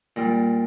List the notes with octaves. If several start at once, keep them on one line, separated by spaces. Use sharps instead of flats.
A#2 G3